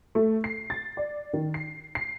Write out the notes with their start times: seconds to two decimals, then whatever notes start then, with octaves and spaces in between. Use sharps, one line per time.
0.15 A3
0.44 C7
0.70 A6
0.97 D5
1.33 D#3
1.54 C7
1.95 C7